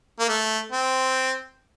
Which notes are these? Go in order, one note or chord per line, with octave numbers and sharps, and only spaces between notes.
A#3
A3
C4